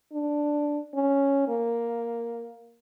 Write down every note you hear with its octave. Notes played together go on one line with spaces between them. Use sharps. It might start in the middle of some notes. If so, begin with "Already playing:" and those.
D4
C#4
A#3